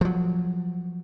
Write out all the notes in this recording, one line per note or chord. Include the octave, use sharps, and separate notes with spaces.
F3 F#3